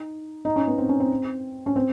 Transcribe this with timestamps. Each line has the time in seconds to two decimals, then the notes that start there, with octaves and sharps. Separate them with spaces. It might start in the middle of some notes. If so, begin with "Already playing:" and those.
Already playing: D#4
0.45 D#4
0.56 C#4
0.67 B3
0.78 C4
0.89 C#4
1.00 C4
1.66 C#4
1.76 C4